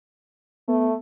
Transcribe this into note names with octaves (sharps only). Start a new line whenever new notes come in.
A3 B3